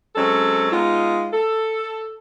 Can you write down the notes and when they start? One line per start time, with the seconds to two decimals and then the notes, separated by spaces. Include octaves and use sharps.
0.16 F#3 G#3 C4 C#4 A4
0.72 G#3 B3 D#4 F4
1.33 A4